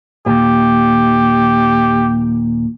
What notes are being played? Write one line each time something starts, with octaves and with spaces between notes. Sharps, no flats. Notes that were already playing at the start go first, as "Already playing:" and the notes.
D#2 A#2 G4